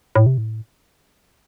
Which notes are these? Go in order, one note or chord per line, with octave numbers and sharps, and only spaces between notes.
A2
C3
A2